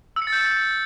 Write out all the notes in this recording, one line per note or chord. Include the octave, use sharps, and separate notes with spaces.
E6
C#7
A6
G6